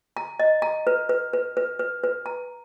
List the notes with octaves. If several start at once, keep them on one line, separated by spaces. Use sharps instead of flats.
A#5
D#5
A#5
B4
B4
B4
B4
B4
B4
A#5